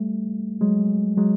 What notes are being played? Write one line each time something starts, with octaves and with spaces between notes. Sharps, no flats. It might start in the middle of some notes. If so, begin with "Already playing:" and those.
Already playing: G3 A3
F#3 G#3
F#3 G#3